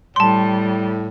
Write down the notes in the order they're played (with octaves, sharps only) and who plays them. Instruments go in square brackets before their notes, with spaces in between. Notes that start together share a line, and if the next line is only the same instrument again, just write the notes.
[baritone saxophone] A2 [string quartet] G3 [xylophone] A5 C6